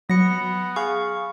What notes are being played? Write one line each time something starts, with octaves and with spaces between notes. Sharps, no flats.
F#3 B3 A#6 C#7
G#4 F5 C#6